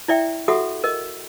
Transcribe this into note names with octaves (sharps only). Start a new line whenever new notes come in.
E4 D5 E5 G5
F#4 G4 A4 E5 F#5 D#6
A#4 D#5